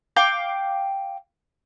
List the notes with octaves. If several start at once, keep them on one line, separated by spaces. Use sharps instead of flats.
F5 G5 D6